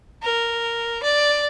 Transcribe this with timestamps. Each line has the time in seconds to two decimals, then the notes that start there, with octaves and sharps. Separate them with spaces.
0.23 A#4
1.03 D5